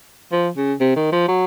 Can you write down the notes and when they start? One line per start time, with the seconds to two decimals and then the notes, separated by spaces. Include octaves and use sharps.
0.32 F3
0.57 C#3
0.80 C3
0.96 D#3
1.12 F3
1.28 F#3